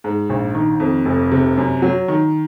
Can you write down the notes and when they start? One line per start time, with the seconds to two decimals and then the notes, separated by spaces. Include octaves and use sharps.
0.04 G#2
0.30 A#1
0.55 D#3
0.80 F2
1.05 F1
1.32 C3
1.57 F#2
1.82 F#3
2.08 D#3